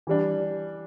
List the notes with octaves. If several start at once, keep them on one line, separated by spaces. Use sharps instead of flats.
E3 G3 D4